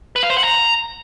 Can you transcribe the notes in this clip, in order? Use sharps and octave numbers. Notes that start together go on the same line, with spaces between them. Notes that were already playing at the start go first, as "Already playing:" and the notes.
B4
F5
C5
F#5
A#5